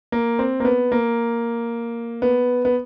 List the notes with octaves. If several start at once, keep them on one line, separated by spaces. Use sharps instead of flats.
A#3
C4
A#3
B3
A#3
B3
B3